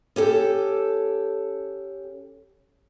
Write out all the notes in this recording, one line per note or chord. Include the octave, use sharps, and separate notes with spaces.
C#4 G4 A4